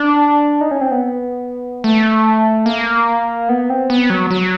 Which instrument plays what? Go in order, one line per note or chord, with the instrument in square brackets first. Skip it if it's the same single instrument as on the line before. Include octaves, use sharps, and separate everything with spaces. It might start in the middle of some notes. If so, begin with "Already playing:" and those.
Already playing: [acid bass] D4
D#4
C#4
C4
B3
A3
A#3
B3
C4
B3
F#3
F#3